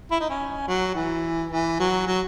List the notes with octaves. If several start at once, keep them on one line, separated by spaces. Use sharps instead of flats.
E4
D#4
C#4
F#3
E3
E3
F#3
F#3